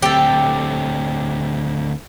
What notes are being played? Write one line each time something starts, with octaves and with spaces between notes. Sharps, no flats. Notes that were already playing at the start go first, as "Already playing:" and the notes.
D2 C4 G4 A4